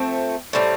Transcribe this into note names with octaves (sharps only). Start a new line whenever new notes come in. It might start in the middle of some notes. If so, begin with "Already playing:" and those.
Already playing: F3 A3 C4
A2 G3 C4